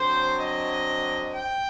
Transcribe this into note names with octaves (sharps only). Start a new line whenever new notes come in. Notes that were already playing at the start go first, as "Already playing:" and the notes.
Already playing: D3 F#3 C4 C5
D#5
G5